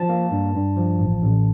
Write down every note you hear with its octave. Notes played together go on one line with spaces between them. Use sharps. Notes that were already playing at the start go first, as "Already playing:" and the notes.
Already playing: F3 A5
A#3
G2
G2
F3
A1
A1